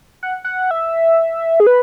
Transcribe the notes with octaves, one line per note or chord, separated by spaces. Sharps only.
F#5
F#5
E5
G#4
B4